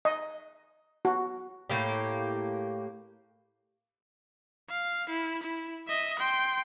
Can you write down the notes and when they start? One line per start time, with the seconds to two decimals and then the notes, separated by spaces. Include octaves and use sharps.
0.05 D#5
1.05 F#4
1.70 A2 A#3 G4
4.70 F5
5.10 E4
5.43 E4
5.88 D#5 E5
6.19 G5 C6